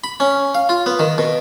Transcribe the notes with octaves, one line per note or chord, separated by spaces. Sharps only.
B5
C#4
F5
F4
B3
D#3
B2